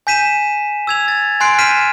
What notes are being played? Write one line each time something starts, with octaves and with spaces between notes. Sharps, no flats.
G#5 G6 B6 D#7 E7
E6 G#6 F7
A6
G#5 C6 F#6 C7 D7
F6 G6 B6 C7 D#7 E7